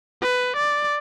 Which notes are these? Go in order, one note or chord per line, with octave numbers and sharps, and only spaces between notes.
B4
D5